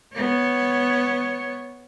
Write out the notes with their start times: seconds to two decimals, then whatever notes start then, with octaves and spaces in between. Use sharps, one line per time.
0.15 B3 C#5